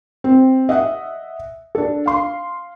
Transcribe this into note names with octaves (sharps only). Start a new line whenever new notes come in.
C4
D#5 E5 F#5
D4 A4
F5 C6